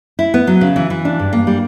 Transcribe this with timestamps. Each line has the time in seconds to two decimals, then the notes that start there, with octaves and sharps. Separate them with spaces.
0.19 E4
0.34 B3
0.47 F#3
0.61 C#3
0.76 E3
0.90 E3
1.05 D4
1.20 G2
1.33 A#3
1.47 G3